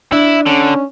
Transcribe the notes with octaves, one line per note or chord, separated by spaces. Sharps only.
D4 E4
D3 C#4